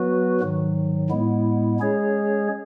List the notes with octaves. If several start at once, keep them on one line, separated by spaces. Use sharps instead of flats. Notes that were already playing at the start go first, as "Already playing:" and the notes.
Already playing: F#3 B3 F#4 B4
G#2 D#3 F#3
A2 G#3 B3 E4
G#3 C#4 G#4 C#5